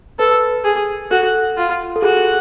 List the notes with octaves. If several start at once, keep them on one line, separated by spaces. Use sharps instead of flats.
A4 B4
G#4
F#4 A4
F4
A4
F#4 G#4